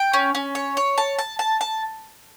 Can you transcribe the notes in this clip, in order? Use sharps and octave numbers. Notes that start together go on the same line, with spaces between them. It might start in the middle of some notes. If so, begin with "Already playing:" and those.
Already playing: G5
C#4
C#4
C#5
C#5
A5
A5
A5
A5